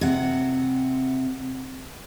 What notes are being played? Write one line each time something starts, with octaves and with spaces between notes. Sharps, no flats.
C3 F#5